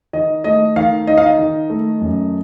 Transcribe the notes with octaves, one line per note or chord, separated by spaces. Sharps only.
D#3 D#5
A3 D#5
D#3 F5
D#4 D#5
F5
D#5
D#3
A3
F#2